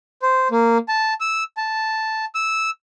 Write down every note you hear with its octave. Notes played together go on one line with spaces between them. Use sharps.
C5
A#3
A5
E6
A5
E6